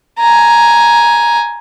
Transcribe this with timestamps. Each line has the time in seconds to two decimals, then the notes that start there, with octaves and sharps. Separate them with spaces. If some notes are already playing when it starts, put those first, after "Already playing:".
0.20 G#5 A#5